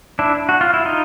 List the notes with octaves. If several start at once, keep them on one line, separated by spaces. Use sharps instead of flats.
D4 E4
F#4
F4
E4
D#4 F4